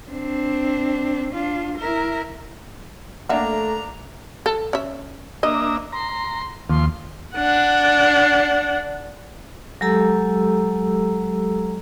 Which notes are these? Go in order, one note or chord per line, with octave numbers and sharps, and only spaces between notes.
C4 D4
D4 F4
E4 A#4
A3 A#3 D4 E5 F#5 A#5
A4
C#4 E5
A#3 D4 D#5 E5 D#6
A#5 C6
D#2 F3 C6
D4 F#5
F#3 G#3 G4 A4 A#5 E6